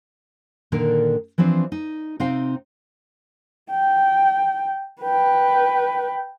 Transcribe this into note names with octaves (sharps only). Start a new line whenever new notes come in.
A#2 D3 D#3 D4 A4 A#4
E3 F3 C4 D4
D#4
C3 C4 D#4 F5 G5
G5
B4 G5